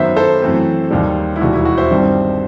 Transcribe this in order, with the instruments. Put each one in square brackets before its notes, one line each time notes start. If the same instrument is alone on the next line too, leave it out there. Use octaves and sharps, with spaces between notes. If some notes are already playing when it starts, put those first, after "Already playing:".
Already playing: [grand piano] F#2 D#3 F#3 B3 C5 E5
A4 C5
F#2 E3 A3 C4
D#2 D#3 G3
E4
E1 D#2 D#3 G3 F#4
E4
F#4
C5 E5
G1 G2 D#3 G3 C4